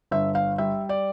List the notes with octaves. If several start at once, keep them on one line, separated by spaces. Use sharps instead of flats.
G1 E5
F5
G3 E5
D5